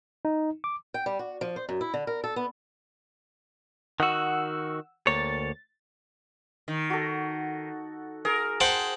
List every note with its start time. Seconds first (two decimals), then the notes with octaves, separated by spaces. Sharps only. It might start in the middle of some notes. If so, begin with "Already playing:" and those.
0.25 D#4
0.64 D6
0.94 G5
1.06 G3
1.19 F#4
1.41 F3
1.56 C5
1.69 F#2
1.81 E4
1.94 D3
2.07 A#4
2.24 A4
2.36 B3
4.00 D#3 F#4 F#5 E6
5.07 D2 A#3 C#5 A6
6.68 D#3
6.90 F#4 A4
8.25 G#4 A#4
8.60 C5 F#5 G5 A5